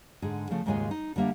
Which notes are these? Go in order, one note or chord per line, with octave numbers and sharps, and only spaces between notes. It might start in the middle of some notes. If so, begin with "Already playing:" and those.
G#2 D3 G#4
C#3 F3 A3
D#2 G#2 C#3 G#3 F4 G#5
D#4
D3 G3 A#3 E5